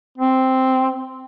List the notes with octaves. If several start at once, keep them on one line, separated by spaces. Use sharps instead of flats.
C4